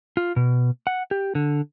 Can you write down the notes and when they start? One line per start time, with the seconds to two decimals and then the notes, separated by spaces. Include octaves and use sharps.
0.17 F4
0.36 B2
0.87 F#5
1.11 G4
1.35 D3